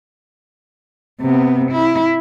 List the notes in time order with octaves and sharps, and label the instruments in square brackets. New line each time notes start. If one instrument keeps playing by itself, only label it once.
[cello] C3 B3
E4